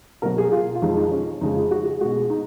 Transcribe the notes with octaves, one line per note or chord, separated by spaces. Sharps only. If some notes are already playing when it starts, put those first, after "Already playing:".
B2 F#3 A#4
G#4
F4
F4
F2 F3 G#3 D#4
D#4
C#4
F2 C#3 G#3 D#4
F4
F#4
G#4
B2 G#3 F#4
D#4